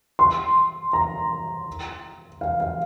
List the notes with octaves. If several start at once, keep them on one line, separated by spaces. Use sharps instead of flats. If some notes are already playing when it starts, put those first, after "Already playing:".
C6
A#5
F5
F5